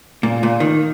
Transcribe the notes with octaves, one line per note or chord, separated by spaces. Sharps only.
A#2
A#2
D#3